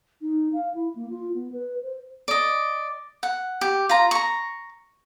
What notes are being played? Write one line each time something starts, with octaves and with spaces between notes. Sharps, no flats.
D#4
F5
E4
A#3
F4
B3
B4
C5
D5 D#5
F#5
G4
F4 A#5
A#5 C#6